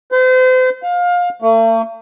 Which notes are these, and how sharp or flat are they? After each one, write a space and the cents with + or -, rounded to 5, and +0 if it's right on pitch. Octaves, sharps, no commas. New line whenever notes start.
C5 -35
F5 +25
A3 +45